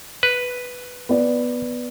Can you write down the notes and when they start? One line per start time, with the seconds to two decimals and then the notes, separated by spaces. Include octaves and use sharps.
0.23 B4
1.09 B3 D5